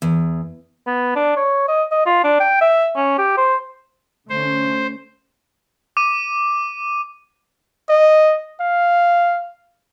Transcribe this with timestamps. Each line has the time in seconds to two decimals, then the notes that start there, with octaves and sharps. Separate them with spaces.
0.02 E2
0.87 B3
1.16 D4
1.37 C#5
1.68 D#5
1.92 D#5
2.06 F4
2.24 D4
2.40 G5
2.61 E5
2.96 C#4
3.18 G4
3.37 C5
4.30 D3 A3 C#4 C5
5.97 D6 D#7
7.89 D#5
8.61 F5